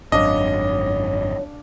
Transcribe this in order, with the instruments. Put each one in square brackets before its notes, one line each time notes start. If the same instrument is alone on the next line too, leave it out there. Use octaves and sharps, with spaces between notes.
[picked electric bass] G#1 F#2 [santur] D4 F5 [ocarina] C#5 [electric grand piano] D#5